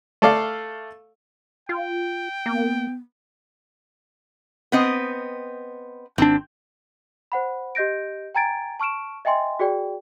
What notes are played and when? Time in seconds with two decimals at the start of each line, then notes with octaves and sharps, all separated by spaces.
0.22 A3 A4 D5 F5
1.69 F4 G5
2.46 A#3 B3
4.72 B3 C4 D#5
6.18 G#1 C4 D4
7.32 C5 F#5 B5
7.75 G4 D#5 G6 A#6 D7
8.35 G5 G#5 A#5 G#6 A6 D7
8.80 A5 C#6 F6 D7 E7
9.25 D#5 E5 G5 G#5 C6
9.59 F#4 G#4 D5 G5